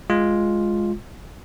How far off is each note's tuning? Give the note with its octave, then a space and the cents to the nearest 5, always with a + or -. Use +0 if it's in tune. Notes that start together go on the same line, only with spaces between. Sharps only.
G#3 +0 F4 +0